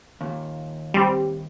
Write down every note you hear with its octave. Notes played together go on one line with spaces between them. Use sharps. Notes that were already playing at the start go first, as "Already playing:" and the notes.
D#2 A#2
G3 C4